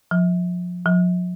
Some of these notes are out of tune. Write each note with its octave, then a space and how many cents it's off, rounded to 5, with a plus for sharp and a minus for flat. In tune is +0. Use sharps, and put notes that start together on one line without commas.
F3 +30
F3 +45